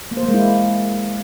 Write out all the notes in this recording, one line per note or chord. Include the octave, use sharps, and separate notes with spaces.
A#3
C5
A#3
G#3
E4